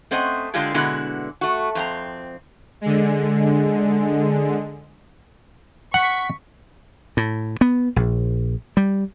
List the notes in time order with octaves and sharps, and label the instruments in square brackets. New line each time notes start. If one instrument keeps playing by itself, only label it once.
[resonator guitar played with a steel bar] A3 C4 C#4 C5 D#5 F#5
D3 G#3 D4 F4 G4 G#4
B2 D3 G#3 B3 E4 F#4
A3 F#4
F2 C4 A#5
[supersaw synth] D3 G#3
[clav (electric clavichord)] F#5 [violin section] C#6 B6
[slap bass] A2
B3
A#1
G3